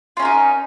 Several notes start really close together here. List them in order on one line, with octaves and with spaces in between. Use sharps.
F4 C#4 A#4 D#4